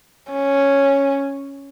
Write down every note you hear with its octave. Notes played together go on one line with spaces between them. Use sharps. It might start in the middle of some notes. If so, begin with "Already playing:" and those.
C#4